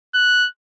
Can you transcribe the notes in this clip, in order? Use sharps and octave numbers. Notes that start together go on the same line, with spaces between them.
F#6